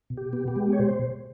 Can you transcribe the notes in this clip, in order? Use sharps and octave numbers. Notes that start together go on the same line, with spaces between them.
B2
G4
B3
G4
G#3
C#5
B2 C5